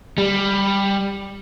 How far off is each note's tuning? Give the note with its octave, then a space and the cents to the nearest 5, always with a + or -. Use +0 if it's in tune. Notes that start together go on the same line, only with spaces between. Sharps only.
G3 +10